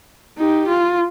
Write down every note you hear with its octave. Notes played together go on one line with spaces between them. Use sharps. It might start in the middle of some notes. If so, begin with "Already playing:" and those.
D#4 G4
F4